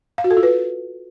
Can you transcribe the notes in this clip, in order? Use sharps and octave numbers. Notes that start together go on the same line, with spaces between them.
F5
F#4
A4
F4
B4